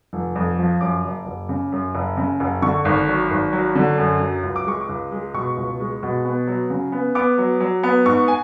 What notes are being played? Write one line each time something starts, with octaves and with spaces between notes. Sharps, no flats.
F1
F2
F3
F#2 D6
F#1
F#1
C#3
F#2
F#1
C#3
F#1
D3 C#6
G#1
F#3
G#1
F#3
D3
F#2
F#3
C#2
D6
G#3 C#6
D6
C#2
G#3
B2 C#6
C#2
G#3
B2
B3
F#3
C#3
B3
B3 D6
F#3
F#3
B3
G#2 C#6
G#5